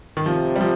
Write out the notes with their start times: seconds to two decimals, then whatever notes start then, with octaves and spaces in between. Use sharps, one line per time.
0.17 D#3
0.26 C3 F3
0.56 G3
0.61 F3